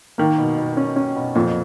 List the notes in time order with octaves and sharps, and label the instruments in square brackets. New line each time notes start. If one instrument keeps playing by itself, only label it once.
[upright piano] D#3 [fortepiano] A#3
[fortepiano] B2
B2
C#4
C#4
B2
[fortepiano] F2 [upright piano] A#2